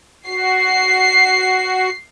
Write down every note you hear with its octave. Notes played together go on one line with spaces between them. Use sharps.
F#4 C7